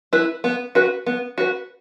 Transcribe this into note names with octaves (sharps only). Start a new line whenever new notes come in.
E4 B4
B3
F#4 B4
B3
F#4 B4